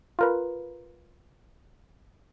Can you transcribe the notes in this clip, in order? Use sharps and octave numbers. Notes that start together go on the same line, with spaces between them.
F4 A#4 B4